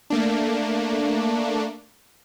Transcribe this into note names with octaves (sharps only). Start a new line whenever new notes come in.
A3 A#3 D4